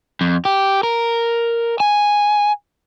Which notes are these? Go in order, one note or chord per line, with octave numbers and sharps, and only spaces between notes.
F2
G4
A#4
G#5